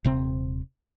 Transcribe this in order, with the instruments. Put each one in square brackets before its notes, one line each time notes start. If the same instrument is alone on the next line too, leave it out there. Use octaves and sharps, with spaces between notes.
[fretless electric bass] D#1 C3 C4